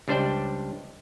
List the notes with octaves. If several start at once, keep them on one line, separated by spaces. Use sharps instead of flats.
C#2 G3 D4 C5 D5 G5